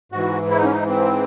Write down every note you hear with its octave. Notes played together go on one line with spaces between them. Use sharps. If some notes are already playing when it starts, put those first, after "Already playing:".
G#2 E3 F#4
E4
D#4
C#4
D#4
C4